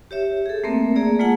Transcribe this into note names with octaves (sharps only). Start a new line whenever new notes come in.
G4 C#5 E5
G#4 A4
A3 A#3 C4 A#4 E5
A3 A#3 G#4 D5
G#3 A#3 F4 G#4 F#5 A5